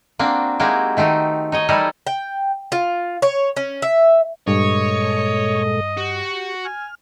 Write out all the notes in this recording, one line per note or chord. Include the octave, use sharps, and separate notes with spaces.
A#3 C4 D4 F#4
G#3 A#3 D#4 E4 F#4 G4
D#3 A3 C4 D#4
D#4 C#5 D#5
E3 G3 D#4 E4 A4 A#4
G5
F4
C#5
C#4
E5
G2 A#2 G#3 A4 C#5 D#5
F#4 G4
G#5 F6